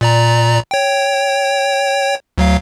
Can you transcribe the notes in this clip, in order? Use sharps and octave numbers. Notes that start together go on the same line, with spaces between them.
A#2 D5 A#5
C#5 G5
D2 F#3 F5